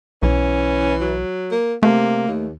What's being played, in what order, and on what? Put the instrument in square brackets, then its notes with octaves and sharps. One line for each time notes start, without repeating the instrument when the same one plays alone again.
[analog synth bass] B1 [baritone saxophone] E3 [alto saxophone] C#4
[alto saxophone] F#3
[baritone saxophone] A#3
[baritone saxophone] C3 [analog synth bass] A3 [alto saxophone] A#3
[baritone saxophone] D#2